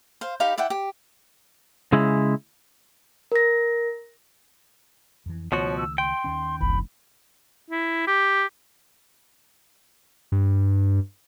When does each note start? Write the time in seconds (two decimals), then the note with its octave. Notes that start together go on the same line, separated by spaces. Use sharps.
0.21 C5 F5
0.40 D#4 G4 F5 B5
0.58 E4 D5 F#5 G5
0.70 G4
1.92 C#3 G#3 E4
3.32 A#4 A#6
5.26 F2 E3
5.52 C#2 B2 D#3 F3 A3 F#4 C#5
5.78 E6
5.98 G5 C6
6.24 D#2 D#3 C#4
6.61 F#1 C2 B5
7.70 E4
8.07 G4
10.32 G2